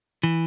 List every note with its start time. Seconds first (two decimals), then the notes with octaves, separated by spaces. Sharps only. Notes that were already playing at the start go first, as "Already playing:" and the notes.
0.23 E3